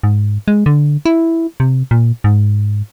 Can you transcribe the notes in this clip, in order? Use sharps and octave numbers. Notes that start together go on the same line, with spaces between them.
G#2
G#3
D3
E4
C3
A#2
G#2